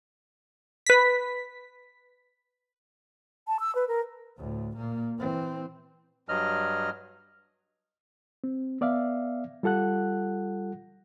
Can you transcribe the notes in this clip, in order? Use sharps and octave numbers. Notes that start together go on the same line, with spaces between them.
B4 B6
A5
E6
B4
A#4
D2 A2
A#2 A#3
E3 C4
G2 F#3 D#5 F6
C4
B3 D5 E5 F5
G3 F4 A4 F#5 F#6